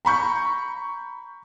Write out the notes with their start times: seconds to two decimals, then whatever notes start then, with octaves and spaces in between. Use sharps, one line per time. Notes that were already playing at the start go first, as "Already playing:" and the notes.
0.05 A#5 B5 C#6 G6